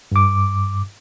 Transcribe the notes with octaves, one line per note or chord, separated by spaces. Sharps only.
G2 D6